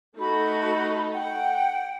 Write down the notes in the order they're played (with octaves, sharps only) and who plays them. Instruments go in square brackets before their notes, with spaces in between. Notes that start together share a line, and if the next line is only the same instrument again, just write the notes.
[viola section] A3 D#4 A4 [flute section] F#4 B5
[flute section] F#5 G5